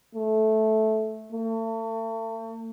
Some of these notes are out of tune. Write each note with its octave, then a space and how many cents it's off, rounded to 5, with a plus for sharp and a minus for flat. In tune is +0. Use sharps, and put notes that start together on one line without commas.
A3 -10
A3 +40